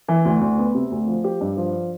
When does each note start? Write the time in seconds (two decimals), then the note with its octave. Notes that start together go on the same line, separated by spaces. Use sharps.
0.08 E3
0.25 D2
0.41 D2
0.58 B3
0.75 C3
0.91 D2
1.08 F3
1.24 G4
1.41 G2
1.57 F3